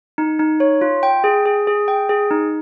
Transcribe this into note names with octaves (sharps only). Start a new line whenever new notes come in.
D#4
D#4
C#5
F4
G5
G#4
G#4
G#4
G5
G#4
D#4